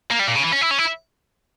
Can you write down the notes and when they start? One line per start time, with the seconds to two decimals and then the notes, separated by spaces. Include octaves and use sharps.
0.11 A#3
0.20 G3
0.28 A#2
0.36 C#3
0.44 E3
0.53 C#4
0.61 E4
0.71 C#4
0.79 E4